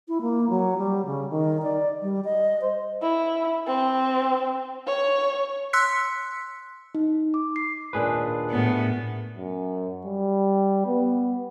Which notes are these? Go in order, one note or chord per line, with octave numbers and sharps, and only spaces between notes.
E4
A#3
F#3
G3
C#3
D#3
D5
G3
D#5
C5
E4
C4
C#5
C6 E6 F#6 B6 C#7
D#4
D6
C7
D#2 A#2 D4 G#4 B4 C5
A2 B3
F#2
G3
B3